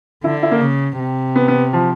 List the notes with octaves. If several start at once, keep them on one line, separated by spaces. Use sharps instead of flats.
D3 E4
E4
A#3
C#3
C3
B3
B3
F3